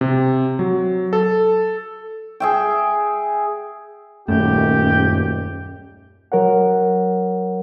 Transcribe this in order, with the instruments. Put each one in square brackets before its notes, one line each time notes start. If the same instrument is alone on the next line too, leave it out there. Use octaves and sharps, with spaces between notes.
[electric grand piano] C3
F#3
A4
[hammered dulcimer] G#4 E5 G5
[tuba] D#1 [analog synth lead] F#2 [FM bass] A3 [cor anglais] G4
[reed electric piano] F#3 A#4 C#5 F#5